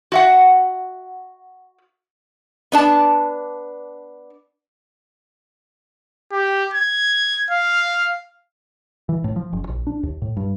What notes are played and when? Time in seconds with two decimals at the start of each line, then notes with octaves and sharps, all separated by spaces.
0.12 F#4 E5 F#5
2.72 B3 D4 A5
6.32 G4
6.74 G#6
7.51 F5
9.09 E3
9.24 A2
9.36 F3
9.53 F#1
9.68 A#1
9.87 D4
10.03 D#2
10.22 A2
10.37 G2